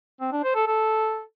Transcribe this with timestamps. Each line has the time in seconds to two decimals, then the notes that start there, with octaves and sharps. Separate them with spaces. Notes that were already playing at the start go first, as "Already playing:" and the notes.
0.20 C4
0.32 D4
0.43 C5
0.55 A4
0.66 A4